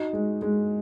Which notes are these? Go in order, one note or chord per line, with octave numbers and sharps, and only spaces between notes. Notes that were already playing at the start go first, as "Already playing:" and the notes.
Already playing: D#4 F#4
G#3
G#3